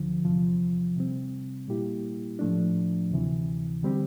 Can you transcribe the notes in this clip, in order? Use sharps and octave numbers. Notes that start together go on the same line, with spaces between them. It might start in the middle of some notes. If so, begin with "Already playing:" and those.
Already playing: D2 D3 F3
E2 C3 F3
C3 G3 C4
A#2 G3 A#3 E4 G4
A2 F3 A3 D4
D2 C3 E3
D3 G3 C4 G4